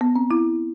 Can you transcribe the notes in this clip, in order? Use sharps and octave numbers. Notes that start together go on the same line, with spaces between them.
B3
C4
E4